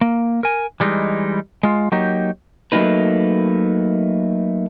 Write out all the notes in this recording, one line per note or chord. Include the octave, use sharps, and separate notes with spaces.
A#3
A#4 G#5
E3 G3 G#3 D#4
G#3 F4
F#3 A#3 D#4 G4
F#3 A3 A#3 D#4 B4